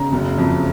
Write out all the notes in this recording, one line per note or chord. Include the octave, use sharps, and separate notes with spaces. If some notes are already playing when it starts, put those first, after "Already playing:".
Already playing: C#3 A#5
F#1
F2